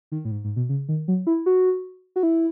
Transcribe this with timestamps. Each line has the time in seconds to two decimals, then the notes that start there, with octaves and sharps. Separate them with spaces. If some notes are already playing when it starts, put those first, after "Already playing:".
0.12 D#3
0.25 A2
0.31 G#2
0.44 G#2
0.56 B2
0.69 C#3
0.89 D#3
1.08 F#3
1.27 E4
1.46 F#4
2.16 F#4
2.23 E4